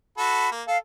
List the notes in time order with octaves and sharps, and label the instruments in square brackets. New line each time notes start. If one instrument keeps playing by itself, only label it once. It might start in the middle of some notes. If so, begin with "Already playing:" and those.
[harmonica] F#4 A4 [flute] B5
[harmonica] A#3
[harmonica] A4 [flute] F5